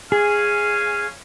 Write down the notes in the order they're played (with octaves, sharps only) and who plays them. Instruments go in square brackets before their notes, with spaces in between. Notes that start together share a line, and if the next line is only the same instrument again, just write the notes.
[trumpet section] C#4 F5 G#5 [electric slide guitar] G#4